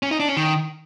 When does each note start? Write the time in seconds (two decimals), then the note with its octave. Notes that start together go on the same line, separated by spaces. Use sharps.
0.03 C#4
0.11 D#4
0.20 D4
0.28 C#4
0.37 D#3